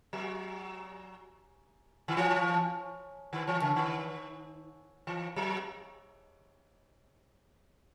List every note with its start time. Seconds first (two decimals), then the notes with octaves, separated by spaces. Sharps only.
0.13 F#3
2.08 D#3
2.17 E3
3.33 D#3
3.47 E3
3.62 C#3
3.76 D#3
5.07 E3
5.36 F#3